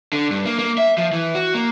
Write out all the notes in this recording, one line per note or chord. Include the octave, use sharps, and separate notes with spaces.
D3
G2
A#3
A#3
E5
F3
E3
F#4
A#3